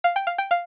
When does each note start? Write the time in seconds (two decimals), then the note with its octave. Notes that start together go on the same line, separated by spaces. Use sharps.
0.04 F5
0.16 G5
0.27 F5
0.38 G5
0.51 F5